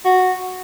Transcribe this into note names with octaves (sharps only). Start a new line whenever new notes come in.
F#4